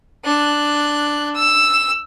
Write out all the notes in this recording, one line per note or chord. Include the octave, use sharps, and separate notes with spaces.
D4 F#6
E6